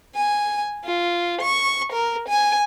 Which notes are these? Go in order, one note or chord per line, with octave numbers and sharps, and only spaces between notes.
G#5
F4
C#6
A#4
G#5